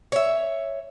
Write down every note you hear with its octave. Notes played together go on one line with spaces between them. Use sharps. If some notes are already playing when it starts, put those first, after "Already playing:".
C#5 E5